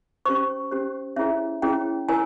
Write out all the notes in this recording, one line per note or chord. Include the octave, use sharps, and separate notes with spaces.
C#4 G4 C5 C#6
C#4 G4 C5
C#4 E4 G#4 C#5 E5
C#4 E4 G#4 C#5 G5
E4 A#4 C#5 G#5